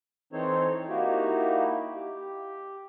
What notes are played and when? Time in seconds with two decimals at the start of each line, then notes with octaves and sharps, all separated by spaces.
0.33 E3 C4 D#4 A4 C5 C#5
0.89 A#3 D#4 E4 F#4 G4
1.95 G4